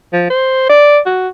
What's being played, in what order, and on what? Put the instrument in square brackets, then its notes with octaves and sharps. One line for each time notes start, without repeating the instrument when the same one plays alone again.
[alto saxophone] F3
C5
D5
F#4